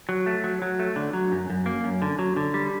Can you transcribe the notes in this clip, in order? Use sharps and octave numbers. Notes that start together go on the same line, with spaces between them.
F#3
A3
F#3
F#3
A3
D3
F#3
F#2
F#2
A#3
F#2
D3
F#3
D3
G3